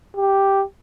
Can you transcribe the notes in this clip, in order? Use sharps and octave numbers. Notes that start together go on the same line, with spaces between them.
G4